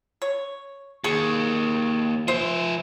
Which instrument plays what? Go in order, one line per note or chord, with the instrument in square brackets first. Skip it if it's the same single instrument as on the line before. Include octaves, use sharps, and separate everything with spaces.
[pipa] C#5
[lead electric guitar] D#2 [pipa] G#4 C#6
[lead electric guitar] F3 E5 [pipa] C5